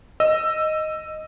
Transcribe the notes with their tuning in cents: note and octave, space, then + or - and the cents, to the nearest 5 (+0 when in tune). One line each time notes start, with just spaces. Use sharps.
D#5 +0 E6 +10